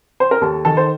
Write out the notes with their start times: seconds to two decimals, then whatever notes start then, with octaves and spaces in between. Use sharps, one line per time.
0.20 C5
0.31 A#4
0.41 D#2 A4
0.65 D#3 A4
0.77 C5